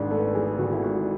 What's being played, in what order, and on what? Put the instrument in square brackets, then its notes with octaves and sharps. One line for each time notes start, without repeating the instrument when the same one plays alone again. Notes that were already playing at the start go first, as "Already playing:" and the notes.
Already playing: [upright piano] G#1 G#2 [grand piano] D4
[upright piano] A3 [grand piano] A4
[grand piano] B4
A4
[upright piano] E3 [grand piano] G#4
[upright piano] G#1 [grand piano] F#4
[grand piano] E4
[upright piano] G#2 [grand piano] F#4